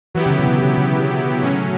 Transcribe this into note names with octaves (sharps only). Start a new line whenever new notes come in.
E3 F#3 B3 E4 G4
C#3
D3
B2
C#3
C#3
C#3
A2 F#3 C#4